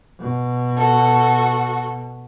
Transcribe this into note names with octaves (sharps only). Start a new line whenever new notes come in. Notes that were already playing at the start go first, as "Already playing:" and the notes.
B2
F#4 A4